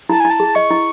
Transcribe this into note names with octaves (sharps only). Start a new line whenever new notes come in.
E4 A5
G#5
E4
A5
G#4
D#5 C#6
E4